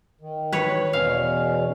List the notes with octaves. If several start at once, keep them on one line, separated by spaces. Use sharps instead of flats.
D#3
B4 C#5
E2 B2 C#4 F5